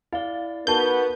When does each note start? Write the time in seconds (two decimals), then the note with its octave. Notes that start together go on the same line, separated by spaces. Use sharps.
0.13 E4 D5 F5
0.67 B3 D#4 F#4 A#4 B4 A5 G6